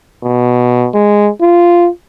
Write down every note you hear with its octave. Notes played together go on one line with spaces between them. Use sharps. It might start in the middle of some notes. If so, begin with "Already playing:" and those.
B2
G#3
F4